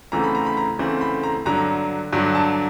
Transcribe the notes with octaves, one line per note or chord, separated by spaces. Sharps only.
D2 C#3 E3 A3 C4 A#5
B5
A#5
B5
A#5
D2 C#3 E3 A3 C4
B5
A#5
G2 D3 F#3 A#5
G2 D3 F#3
A5